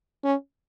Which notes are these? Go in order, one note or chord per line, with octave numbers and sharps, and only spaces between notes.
C#4